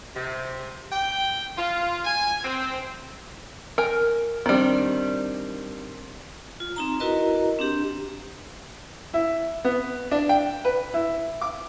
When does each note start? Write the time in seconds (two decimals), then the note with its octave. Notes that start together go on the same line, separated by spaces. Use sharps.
0.16 C3
0.92 G5
1.58 F4
2.05 G#5
2.44 C4
3.78 A#4 G5 G#5
4.46 D#3 G3 C4 D4
6.60 F4
6.76 C4 D#4 A#5
7.00 E4 F#4 A#4 B4 D#5 A#5
7.59 C4 D4 G4
9.14 E4
9.65 B3
10.11 D4
10.29 G5
10.65 B4
10.94 E4
11.41 D6